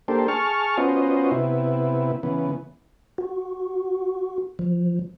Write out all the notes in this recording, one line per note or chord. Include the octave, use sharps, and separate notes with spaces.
A#3 D4 G4 A4 C5
G#4 A5 C#6 F6
B3 C#4 F4 F#4 C5 D#5
C3 B3 E4
C#3 E3 B3
F#4
F3